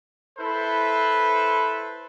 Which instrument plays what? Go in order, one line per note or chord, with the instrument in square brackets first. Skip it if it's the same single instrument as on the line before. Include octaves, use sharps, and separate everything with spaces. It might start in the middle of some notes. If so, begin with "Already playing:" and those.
[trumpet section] E4 A4 B4 C5